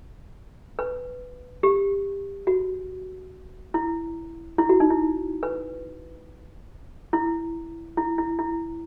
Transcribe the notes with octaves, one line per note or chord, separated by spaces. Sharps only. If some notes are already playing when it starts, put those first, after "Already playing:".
B4
G4
F#4
E4
E4
F#4
D#4
E4
B4
E4
E4
E4
E4